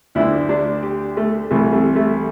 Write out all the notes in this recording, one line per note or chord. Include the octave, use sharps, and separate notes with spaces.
D2 D3 E4
D4
G4
A3
C2 C3 E3 A3
A3
A3